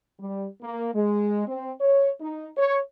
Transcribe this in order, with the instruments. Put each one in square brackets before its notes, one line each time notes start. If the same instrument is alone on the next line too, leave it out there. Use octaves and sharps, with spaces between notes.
[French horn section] G3
A#3
G#3
C4
C#5
D#4
C#5